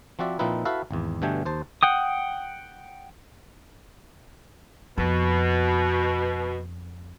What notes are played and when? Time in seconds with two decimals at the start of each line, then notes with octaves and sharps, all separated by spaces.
0.19 F3 C4 F#4 D5 E5
0.39 A#2 F3 C4 D#4 E4 B4
0.65 E4 F#4 A4 B4 E5 F5
0.91 G#1 E2
1.22 G2 B2 D3 A3 G5 G#5
1.45 D#2 C5 A5
1.83 F#5 G5 D#6
4.98 F2 B2